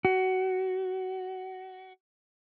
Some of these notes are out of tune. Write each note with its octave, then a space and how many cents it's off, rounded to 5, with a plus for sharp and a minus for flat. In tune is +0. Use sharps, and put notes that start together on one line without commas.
F#4 +20